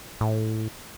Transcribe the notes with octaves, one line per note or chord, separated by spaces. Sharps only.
A2